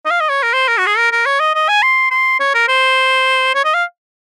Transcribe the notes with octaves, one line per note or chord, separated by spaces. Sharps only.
D#5
F5
D#5
C#5
A#4
C5
A#4
F#4
G#4
A#4
A#4
C#5
D#5
D#5
G#5
C6
C6
C#5
A#4
C5
C#5
D#5
F5